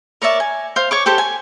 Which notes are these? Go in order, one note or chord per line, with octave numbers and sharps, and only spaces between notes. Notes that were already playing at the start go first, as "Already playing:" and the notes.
A#4 C#5 D5 E5
G#5
C5 F5
C#5 C#6 D6
G4 A4 C5 G5
G#5